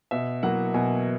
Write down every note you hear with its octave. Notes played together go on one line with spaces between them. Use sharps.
B2 E5
F#3 A#3 E4 F#5
B2 G#5